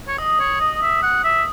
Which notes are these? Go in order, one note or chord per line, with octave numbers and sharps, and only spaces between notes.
C#5
D#5 D#6
C#5
D#5
E5
F#5
E5